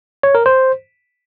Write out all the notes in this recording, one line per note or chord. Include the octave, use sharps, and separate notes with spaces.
C#5
A#4
C5